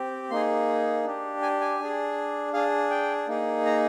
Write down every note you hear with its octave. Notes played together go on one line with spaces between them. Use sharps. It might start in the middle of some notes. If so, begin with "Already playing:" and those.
Already playing: C4 G4
A#3 D#4 G#4 C6
D4 G4
G#5
G#5
D4 G#4
D4 G#4 F5
G5
A#3 D#4 G#4
A#5